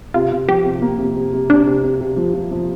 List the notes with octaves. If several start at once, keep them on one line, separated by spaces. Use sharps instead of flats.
C3 F4
C3
F3 G4
C3
A#3
C3
C3
C3
C3 D4
C3
C3
C3
F3
F3
F3